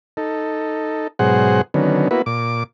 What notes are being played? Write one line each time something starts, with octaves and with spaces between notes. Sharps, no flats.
D#4 A4
G#2 B2 F#3 G#4 C5 F#5
D3 D#3 F#3 B3 C#4
A#3 B3 E4 F#4 B4
A#2 D6